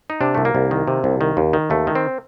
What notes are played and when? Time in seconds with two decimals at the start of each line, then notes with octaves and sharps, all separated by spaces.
0.10 D#4
0.21 C3 D4
0.35 C2 A3
0.45 A#3
0.55 C2
0.71 D#3
0.88 C3
1.04 C2
1.21 D#3
1.37 D#2
1.53 D#3
1.70 D#2 A3
1.87 D#3
1.95 C4